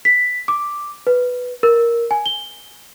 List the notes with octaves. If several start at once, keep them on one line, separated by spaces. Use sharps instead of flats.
B6
D6
B4
A#4
G#5
G7